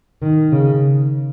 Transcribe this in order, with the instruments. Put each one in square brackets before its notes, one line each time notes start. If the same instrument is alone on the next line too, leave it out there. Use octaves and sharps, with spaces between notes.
[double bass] D#3
C#3